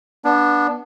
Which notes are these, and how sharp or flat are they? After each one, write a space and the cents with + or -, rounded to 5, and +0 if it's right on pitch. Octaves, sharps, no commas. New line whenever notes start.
B3 -25 D4 +0